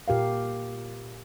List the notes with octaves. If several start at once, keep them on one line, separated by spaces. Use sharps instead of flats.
A#2 G4 A#4 F5